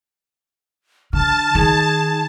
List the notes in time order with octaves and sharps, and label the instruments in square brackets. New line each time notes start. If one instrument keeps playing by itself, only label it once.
[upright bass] D3 [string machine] A5 [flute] F6
[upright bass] D#3 [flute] G#4